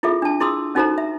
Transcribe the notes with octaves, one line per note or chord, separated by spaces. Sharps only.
E4 F4 G#4 A4 E5
D4 A5
E4 G#4 C6 D#6 E6
C#4 D#4 F#4 A4 C5 A#5
E5